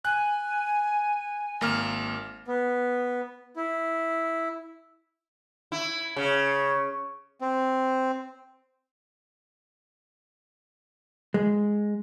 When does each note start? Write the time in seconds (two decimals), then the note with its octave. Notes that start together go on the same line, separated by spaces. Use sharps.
0.05 G#5 F#6
1.61 G#1 A#3 F6
2.48 B3
3.57 E4
5.72 E4
6.16 C#3
7.40 C4
11.34 G#3